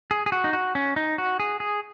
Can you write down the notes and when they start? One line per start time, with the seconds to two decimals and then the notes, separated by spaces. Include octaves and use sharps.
0.11 G#4
0.26 G#4
0.32 F#4
0.44 D#4
0.53 F#4
0.75 C#4
0.96 D#4
1.18 F#4
1.40 G#4
1.60 G#4